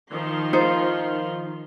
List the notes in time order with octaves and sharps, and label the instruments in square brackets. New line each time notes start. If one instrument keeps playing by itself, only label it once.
[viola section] D#3 F3 C6
[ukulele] D#4 F4 C5